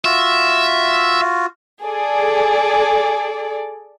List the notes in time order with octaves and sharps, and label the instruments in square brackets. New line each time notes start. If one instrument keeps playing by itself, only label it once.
[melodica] F4 F#4 [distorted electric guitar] E5
[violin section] G#4 A4 D5